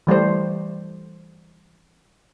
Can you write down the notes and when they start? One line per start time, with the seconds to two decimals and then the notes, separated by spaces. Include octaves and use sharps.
0.07 E3 G3 A3 C5